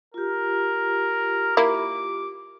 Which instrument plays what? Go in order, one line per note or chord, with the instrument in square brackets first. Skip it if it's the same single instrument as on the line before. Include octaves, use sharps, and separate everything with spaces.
[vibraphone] F4 G4 [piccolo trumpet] A#4
[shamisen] A#3 E4 [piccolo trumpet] D6